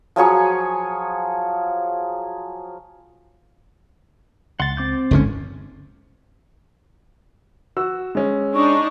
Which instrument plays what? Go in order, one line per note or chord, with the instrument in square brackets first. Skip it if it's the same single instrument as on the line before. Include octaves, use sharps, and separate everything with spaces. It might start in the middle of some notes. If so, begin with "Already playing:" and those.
[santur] F3 F#3 G#4 C#6
[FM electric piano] C#2 A6 [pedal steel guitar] F#5 C6
[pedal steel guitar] C4 D6 G6
[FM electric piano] G1 G#2 [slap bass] C#2 D3 C#4
[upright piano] F#4 E6
G#3 C#4
[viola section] D4 D#4 [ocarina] C#6